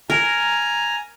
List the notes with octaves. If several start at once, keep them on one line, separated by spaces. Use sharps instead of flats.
A#4 G#5 A#5